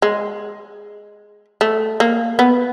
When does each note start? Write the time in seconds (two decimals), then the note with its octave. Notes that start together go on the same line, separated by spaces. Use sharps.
0.02 G#3
1.61 A3
2.00 A#3
2.39 B3